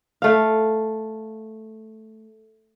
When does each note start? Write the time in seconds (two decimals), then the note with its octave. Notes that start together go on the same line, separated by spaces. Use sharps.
0.22 A3 F5